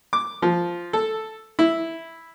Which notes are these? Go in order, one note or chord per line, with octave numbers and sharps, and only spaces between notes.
D6
F3
A4
E4